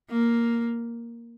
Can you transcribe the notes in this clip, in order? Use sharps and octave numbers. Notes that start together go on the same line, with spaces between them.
A#3